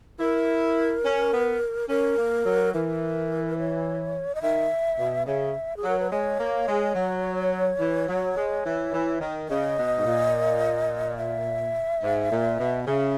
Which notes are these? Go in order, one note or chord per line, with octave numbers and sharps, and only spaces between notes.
E4 A#4
C#4
B3
C#4 A#4
A#3
F#3
E3 A#4
C#5
D#5
D#3 E5
B2
C#3 E5
G#4
F#3
A#4
B4
G#3 C#5
A#3
G#3
F#3
E3
F#3
G#3
E3
E3
D#3
C#3 D#5
B2
G#2
A#2
E5
G#2
A#2
B2
F#5
C#3 E5